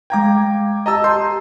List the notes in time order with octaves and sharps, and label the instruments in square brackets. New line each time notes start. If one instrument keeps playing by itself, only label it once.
[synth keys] G#3 F5 G#6 [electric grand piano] G5 A#5 D6
[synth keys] G4 A#5 [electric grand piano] D#5 A5 E6
[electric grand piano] A5 C6 G6